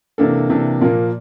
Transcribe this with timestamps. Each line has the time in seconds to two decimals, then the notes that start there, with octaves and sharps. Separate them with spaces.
0.18 C3 E3 A#3 D4 A4
0.49 C3 E3 A#3 D4
0.81 A#2 F3 A#3 A#4